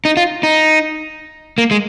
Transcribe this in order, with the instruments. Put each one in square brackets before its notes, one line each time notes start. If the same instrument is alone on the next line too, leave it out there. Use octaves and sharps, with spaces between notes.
[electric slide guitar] D#4
F4
D#4
A#3
G#3